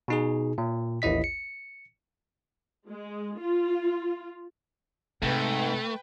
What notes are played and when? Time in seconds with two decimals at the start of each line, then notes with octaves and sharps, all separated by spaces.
0.08 B2 D#4 G#4
0.58 A#2
1.02 A1 D#2 E4 D#5 B6
1.24 C#7
2.89 G#3
3.40 F4
5.22 G#2 C3 A3 B4 G5